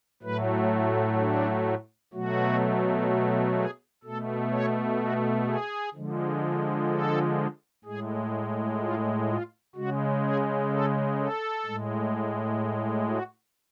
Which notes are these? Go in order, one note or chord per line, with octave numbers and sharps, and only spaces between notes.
A2 F#3 A3 B4
D4
B2 F#3 A3 F#4
G#4
B2 A3 A4
C#5
F#4
G#4
D3 F3 G#3
A4
A2 G#3 G#4
F4
F4
C#3 G#3 F#4
G#4
A4
A4
A2 G#3
F#4